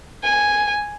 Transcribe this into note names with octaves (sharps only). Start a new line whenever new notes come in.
G#5